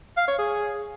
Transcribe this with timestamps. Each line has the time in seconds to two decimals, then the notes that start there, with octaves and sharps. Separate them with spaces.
0.17 F5
0.28 C#5
0.38 G#4